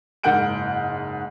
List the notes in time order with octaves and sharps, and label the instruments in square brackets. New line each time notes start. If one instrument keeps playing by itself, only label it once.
[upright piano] F#1 G#2 A#4 F#5 G6 D7